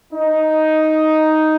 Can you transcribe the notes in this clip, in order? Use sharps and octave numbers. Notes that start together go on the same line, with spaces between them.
D#4